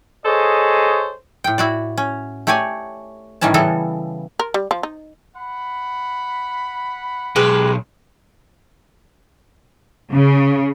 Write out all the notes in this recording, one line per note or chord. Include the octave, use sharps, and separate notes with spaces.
G#4 A4 C5 C#5 D#5
A2 G5
E4 F#4 D5
C#4
A3 G4 C#5 D5 G#5
A2 D#3 E3 G3 C#4 A5
C#3 E3 G3 B3 A4
A#4
G3
F3
D#4
F#5 B5
B1 G#3 G4 B4
C#3